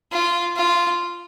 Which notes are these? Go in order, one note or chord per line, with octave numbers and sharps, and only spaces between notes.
F4
F4